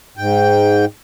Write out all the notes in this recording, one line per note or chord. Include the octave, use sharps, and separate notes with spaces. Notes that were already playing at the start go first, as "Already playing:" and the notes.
G#2 G5